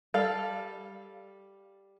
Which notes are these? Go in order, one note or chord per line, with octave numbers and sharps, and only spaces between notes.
G3 A4 F5